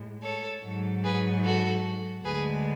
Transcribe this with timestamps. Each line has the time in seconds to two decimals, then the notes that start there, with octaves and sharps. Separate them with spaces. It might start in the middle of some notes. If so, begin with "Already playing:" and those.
Already playing: A2 G#3
0.22 A4 C#5
0.63 G#2 F#3
1.04 G#4 B4
1.43 F#4 A4
2.24 D2 D3 G#3 G#4 B4